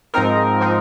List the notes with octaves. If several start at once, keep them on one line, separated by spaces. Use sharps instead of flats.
G#2 F3 C4 D#4 A#4
F3 C4 D#4